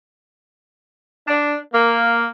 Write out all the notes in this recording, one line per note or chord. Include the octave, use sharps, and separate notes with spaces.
D4
A#3